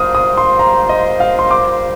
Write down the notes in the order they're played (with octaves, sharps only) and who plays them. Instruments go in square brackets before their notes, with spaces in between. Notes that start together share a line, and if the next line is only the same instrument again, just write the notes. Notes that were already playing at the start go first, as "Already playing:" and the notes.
Already playing: [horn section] G3 A#3 F4 C5 [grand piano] D#6 F6
[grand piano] D#6
C6
A#5
D#5
F5
C6
D6